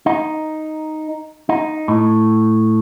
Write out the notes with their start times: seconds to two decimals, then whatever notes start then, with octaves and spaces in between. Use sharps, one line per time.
0.06 D#4
1.49 D#4
1.88 A2